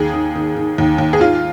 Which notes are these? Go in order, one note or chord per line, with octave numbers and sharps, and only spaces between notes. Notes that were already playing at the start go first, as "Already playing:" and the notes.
Already playing: D#2 G#4
D#3
D#3
D#3
D#2
D#2
G#4
D#3 F4